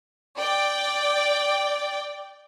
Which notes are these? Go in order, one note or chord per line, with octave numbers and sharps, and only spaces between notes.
D5 G5